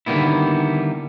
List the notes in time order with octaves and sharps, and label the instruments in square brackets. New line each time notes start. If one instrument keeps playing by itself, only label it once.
[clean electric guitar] D3 D#3 G3 A#3 B3 E4